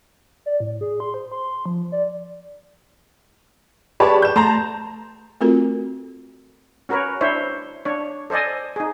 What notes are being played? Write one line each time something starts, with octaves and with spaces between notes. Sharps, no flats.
D5
A2
G#4
C6
C5
C6
F3
D5
G4 G#4 B4 C#5 D5 A5
G6 E7
A3 A5 A#5 C6
A3 C4 F4 F#4 A4 A#4
C#4 F#4 A#4 B4 C#5
D4 E4 C5 C#5 E5
D4 C#5
A4 C5 D5 D#5 G#5
D#4 G#4